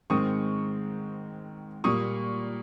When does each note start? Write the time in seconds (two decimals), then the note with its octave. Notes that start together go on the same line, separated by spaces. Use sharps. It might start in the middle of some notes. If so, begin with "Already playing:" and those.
0.10 G#2 D#3 G#3 C4 C#6 D#6
1.84 A#2 G3 A#3 C#6 D#6